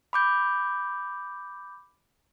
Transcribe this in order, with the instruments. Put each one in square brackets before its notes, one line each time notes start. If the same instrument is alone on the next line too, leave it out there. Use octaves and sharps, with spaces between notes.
[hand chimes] B5 D6 G6